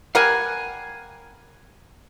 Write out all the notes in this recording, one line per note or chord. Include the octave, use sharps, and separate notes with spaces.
G3 A#4 F5 F#5 G#5